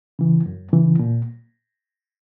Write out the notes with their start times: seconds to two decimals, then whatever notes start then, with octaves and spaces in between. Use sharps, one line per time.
0.19 C#3 E3
0.46 F#2
0.73 C#3 E3
0.99 A#2